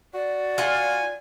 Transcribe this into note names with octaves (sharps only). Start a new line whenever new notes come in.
F#4 D5
F4 F#5 G#5